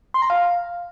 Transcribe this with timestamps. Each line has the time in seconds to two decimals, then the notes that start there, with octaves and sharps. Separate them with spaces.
0.14 C6
0.22 A#5
0.30 F5